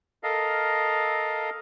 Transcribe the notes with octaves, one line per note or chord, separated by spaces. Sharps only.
A4 A#4 D#5 F5